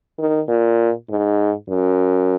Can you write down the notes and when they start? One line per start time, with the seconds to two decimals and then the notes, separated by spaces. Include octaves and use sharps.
0.19 D#3
0.48 A#2
1.09 G#2
1.69 F#2